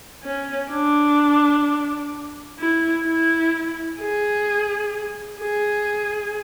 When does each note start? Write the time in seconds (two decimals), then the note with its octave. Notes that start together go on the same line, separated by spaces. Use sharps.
0.24 C#4
0.71 D4
2.59 E4
3.06 E4
4.00 G#4
5.40 G#4